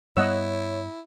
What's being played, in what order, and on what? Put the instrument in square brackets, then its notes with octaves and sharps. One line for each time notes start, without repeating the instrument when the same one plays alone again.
[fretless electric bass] G2 G3 B3 [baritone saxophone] E4 [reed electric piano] C#5 [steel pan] D#5 F#5 E6